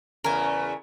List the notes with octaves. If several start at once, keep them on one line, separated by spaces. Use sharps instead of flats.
E2 C#3 A3 A#4 G#5